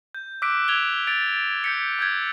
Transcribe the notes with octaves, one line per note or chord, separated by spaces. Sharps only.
G6
D6 E6 F#6 B6 D7
G#6 F7 G7
G#6 A6 D7 F7
G6 B6 C#7
E6 G6 G#6